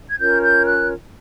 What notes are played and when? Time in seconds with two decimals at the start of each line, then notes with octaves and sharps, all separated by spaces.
0.10 G#6
0.19 C#4 F4 A#4 C#5 G6
0.42 G6
0.66 F#6